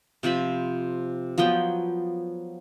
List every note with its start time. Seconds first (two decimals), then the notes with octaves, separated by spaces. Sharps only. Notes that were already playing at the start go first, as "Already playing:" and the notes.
0.23 C3 F3 C4 B5
1.38 F3 F#3 B3 G5